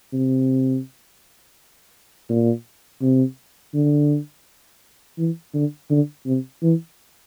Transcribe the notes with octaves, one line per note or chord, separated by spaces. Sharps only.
C3
A#2
C3
D3
E3
D3
D3
C3
E3